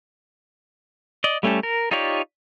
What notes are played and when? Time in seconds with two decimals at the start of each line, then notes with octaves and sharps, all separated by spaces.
1.24 D5 D#5
1.43 G3 A3 C#4 G4 A4
1.63 A#4
1.91 D#4 F4 G4 C#5 D5